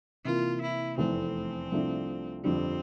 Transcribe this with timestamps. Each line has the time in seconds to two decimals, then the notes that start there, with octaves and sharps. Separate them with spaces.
0.25 C3 E3 A#3 F4
0.61 E4
0.98 F1 E2 E3 A3 C4 E4
1.72 C2 C3 F3 A3 D4
2.44 G1 F2 D3 G3 C4 D4